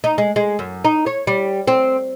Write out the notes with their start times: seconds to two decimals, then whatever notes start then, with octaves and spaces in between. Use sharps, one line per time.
0.04 D#4
0.18 G#3
0.36 G#3
0.59 F#2
0.85 D#4
1.06 C#5
1.27 G3
1.68 C4